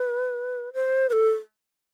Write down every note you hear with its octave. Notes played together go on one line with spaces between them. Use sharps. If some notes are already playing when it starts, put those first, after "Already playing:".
Already playing: B4
C5
B4
A4